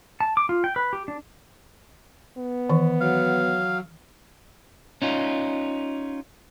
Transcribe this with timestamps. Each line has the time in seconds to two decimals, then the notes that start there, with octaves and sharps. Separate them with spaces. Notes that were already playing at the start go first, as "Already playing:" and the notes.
0.21 A5
0.37 D6
0.49 F4
0.64 G5
0.76 B4
0.93 G4
1.08 D4
2.37 B3
2.69 D#3 E3
3.01 F#3 F5
5.02 C#4 D#4 F4